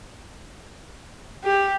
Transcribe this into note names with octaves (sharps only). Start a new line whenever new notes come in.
G4